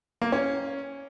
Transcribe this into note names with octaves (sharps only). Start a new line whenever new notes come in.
A#3
C#4